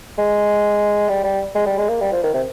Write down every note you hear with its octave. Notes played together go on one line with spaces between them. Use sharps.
G#3
G3
G3
G#3
G3
G#3
A#3
G3
F3
D#3
C3